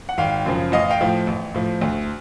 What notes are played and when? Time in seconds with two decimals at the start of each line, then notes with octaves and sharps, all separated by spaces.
0.09 F#5
0.18 G#1 F5 G5
0.46 F#2 C#3 F3
0.72 A1 D#5 F5
0.90 F5 G5
1.01 A2 F3
1.27 A1
1.54 A2 F3
1.81 D2